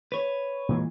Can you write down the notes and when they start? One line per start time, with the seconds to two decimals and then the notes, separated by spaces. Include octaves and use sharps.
0.12 B4 C#5
0.69 A#2 E3 G#3